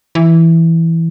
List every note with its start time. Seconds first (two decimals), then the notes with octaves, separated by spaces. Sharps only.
0.15 E3